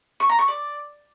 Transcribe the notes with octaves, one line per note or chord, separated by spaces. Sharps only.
C#6
A#5
C#6
D5